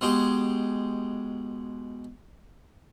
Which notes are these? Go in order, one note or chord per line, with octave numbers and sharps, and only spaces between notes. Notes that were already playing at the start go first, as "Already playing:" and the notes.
B2 G#3 G4